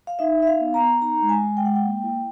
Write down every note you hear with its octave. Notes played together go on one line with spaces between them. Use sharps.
F5
D#4 E5
D#4 E5
F5
B3
A#5
B3
D#4 A#5
G#3
G#5
G#3
G5
G#3 F#5
G5
A#3
E4